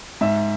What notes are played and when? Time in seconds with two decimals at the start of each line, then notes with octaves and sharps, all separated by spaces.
0.21 G#2 E5